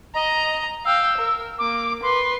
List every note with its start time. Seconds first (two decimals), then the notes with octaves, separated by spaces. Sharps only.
0.14 D#5 A#5
0.85 F5 G5 E6
1.17 A#4
1.58 A#3 D6
2.02 B4 C6